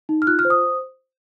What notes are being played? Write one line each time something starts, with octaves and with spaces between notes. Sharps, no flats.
D#4
F6
F4 F#6
F6
C5
D#6